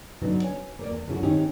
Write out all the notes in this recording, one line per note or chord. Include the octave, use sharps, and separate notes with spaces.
D3 F#3 B3 C#4 D#4
C#5 G#5
A#3 A#4 D5
E2
F#2 D3 G#3 C#4 E4 F#4
D#3 C4 C#4 D#4 G4